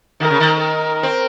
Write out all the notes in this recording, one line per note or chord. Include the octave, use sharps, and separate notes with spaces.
D#3 A#4
C#3
D#3
A#4
C4